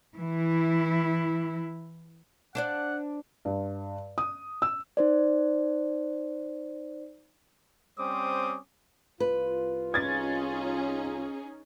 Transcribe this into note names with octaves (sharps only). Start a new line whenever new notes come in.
E3 E4
D4 C5 D5 F#5
G2
D#6
E6
D#4 C5 D5
G3 C4 C#4 C5 D6 D#6
C2 F4 B4
C#4 D#4 G#4 G#6 A6